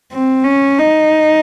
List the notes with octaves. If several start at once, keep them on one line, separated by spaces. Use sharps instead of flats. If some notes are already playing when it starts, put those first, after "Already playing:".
C4
C#4
D#4